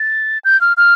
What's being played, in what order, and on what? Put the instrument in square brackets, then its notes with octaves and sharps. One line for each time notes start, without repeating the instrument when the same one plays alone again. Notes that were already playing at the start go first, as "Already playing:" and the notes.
Already playing: [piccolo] A6
G6
F6
F6